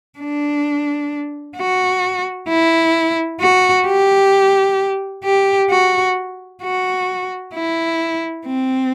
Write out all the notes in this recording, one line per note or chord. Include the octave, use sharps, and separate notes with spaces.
D4
F#4
E4
F#4
G4
G4
F#4
F#4
E4
C4